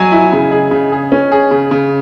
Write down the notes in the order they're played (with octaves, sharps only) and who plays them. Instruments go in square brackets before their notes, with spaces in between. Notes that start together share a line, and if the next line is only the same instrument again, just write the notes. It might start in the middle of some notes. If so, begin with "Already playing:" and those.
Already playing: [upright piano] F#3 [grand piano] G#5
[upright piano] E4
C#3
G#4
C#3
G#4
C#4
G#4
C#3
C#3